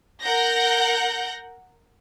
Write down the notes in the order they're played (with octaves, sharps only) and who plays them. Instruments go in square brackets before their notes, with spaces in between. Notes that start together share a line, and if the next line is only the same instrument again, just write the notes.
[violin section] A#4 F#5 G6 A#6